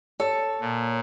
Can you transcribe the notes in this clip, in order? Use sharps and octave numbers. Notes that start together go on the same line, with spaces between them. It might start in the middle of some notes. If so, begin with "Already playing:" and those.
A4 C#5
A#2